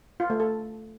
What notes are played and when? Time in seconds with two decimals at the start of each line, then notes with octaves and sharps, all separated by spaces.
0.20 F4
0.30 A3
0.40 A4